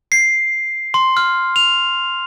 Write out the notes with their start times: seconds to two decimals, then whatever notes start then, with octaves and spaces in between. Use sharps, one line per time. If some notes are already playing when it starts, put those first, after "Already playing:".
0.12 C7
0.94 C6
1.17 F6
1.56 F7